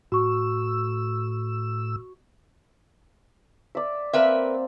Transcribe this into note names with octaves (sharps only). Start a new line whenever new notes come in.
A2 F#4 C#6 E6
D5 E5
A#3 C4 A#4 B4 E5